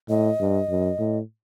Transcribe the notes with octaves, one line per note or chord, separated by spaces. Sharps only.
A2 D#5
G2
F#2
A2